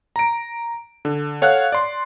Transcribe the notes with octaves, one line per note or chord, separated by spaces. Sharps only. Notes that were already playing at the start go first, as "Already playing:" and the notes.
A#5 D7
D3
A4 C#5 F5 F#5 F#6
D5 C6